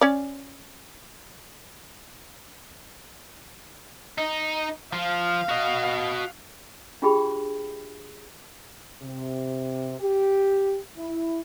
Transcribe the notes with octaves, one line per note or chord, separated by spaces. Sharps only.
C#4 D5
D#4
F3 F4 F5
F#4 D#5
D4 F4 G4 G#4 G5 B5
C3
G4
E4